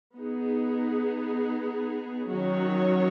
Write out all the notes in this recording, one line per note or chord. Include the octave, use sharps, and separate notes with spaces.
B3 D#4 G#4
D#3 F#3 C#4 F#4 C#5